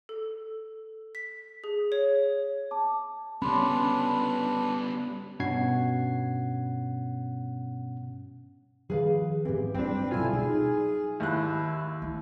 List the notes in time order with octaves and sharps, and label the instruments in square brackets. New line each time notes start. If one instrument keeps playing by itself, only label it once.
[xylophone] A4
B6
G#4
C#5
[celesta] A5 D6
[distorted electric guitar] G3 B3 [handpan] C#4 [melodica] D4 B4 [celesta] B5 C6
[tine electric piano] G2 B2 C#4 F#5 G#6 C7
[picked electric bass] D#3 F3 G3 [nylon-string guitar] G#4 B4 F5
[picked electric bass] G#2 C4 [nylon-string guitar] E3 G4
[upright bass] G2 F#3 [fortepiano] C4 D4 [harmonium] B4
[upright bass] B2 F#3 [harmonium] D3 E4 G#5 [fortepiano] F4
[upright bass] F#3 D#4 [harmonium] G#4
[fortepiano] D#2 F#6 [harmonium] E4
[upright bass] A3 E4